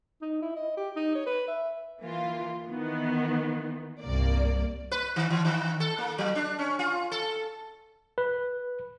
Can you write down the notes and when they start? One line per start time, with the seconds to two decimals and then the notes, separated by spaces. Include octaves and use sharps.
0.22 D#4
0.42 E4
0.56 D#5
0.77 G4
0.96 D#4
1.15 C#5
1.27 B4
1.48 E5
2.00 E3 A#3 F4
2.66 D#3 E3 B3
4.01 C2 G2 A#3 D5
4.91 B4
5.16 D#3
5.30 E3
5.45 D#3
5.80 A4
5.98 A#3
6.18 F#3
6.35 D4
6.59 C#4
6.79 F4
7.11 A4
8.18 B4